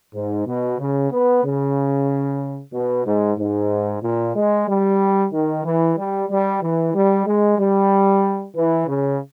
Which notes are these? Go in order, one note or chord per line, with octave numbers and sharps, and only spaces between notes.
G#2
B2
C#3
B3
C#3
B2
G#2
G#2
A#2
G#3
G3
D#3
E3
G3
G3
E3
G3
G#3
G3
E3
C#3